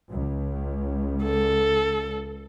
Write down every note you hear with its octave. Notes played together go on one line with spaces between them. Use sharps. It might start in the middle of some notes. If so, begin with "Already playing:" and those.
C#2
A4